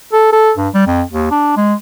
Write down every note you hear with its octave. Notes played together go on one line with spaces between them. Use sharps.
A4
A4
G2
G3
F2
D#2
D4
G#3